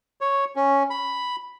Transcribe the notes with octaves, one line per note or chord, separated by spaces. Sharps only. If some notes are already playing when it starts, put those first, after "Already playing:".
C#5
C#4
B5